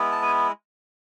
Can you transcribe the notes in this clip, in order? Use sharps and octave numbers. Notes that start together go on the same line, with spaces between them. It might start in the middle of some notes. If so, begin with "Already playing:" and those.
Already playing: G#3 B3 E4
A5
G#5